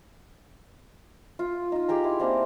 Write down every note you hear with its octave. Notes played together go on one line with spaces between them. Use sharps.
F4
D#4 F4
G4 G#4 G5 A#5
E4 C6
A#3 C4 D4